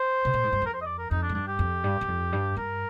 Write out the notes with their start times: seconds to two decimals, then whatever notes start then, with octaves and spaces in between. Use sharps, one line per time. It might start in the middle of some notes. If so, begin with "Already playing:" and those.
Already playing: C5
0.25 C3
0.34 A#2
0.43 G#2
0.52 G2
0.62 F2 A#4
0.74 C5
0.82 D#5
0.86 D5
0.99 A#4
1.11 F2 D#4
1.22 D4
1.29 G#2
1.35 G2 D4
1.48 G4
1.59 F2
1.84 G2
2.01 G2
2.08 F2
2.32 G2
2.57 G2 A#4